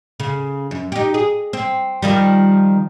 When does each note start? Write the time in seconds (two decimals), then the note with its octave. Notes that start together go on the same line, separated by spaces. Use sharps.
0.20 C#3
0.71 F#2
0.92 D#4 G4
1.14 G#4
1.53 C4
2.02 D#3 F3 G3